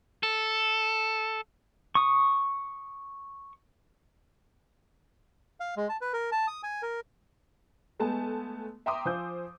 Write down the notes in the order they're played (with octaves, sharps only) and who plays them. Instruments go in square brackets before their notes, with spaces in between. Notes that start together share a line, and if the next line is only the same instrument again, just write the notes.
[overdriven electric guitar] A4
[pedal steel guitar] C#6 D#6
[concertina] F5
G#3
A5
B4
A#4
A5
D#6
G#5
A#4
[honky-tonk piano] G#3 A3 B3 G#5 A5
E5 G5 A#5 C6 D6 D#6
F3 C5 G#5 E6 G6